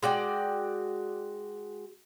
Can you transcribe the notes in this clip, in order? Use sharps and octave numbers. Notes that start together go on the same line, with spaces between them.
G#3 F#4 D5 G5